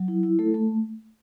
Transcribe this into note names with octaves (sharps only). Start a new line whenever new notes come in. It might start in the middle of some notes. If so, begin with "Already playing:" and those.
Already playing: F#3
E4
E4
A3 A4
A3